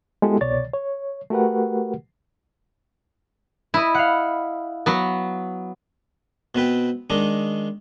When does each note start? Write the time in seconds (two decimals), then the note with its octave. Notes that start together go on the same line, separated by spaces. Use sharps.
0.22 G#3 B3 E4 F#4 G4 A4
0.41 C2 B2 C#5 D5 A6
0.73 C#5
1.30 A3 F#4 G4 A#4 B4 F#5
3.74 E4 D#5 B5
3.95 F5 F#5
4.86 F#3 B3
6.55 B2 C4 B4 G5
7.10 D#3 G#3 D4 D#4